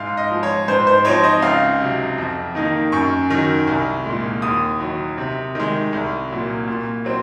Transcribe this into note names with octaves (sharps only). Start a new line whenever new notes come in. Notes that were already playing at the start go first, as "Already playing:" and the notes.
Already playing: G#2 F5
D#5
F3 G#3
C#5
G#2 C5
C5
F3 C4 D#4 C#5
D#5
C#2 F5
C3 F#3
F2
D#3 A#3 D#4
F#2 C#6
D#3 F#3
C2
A#2 G#3
D#2 D#6
D#3 F#3
C3
D#3 G#3
C2
A#2 F#3
A#2
F#3 C4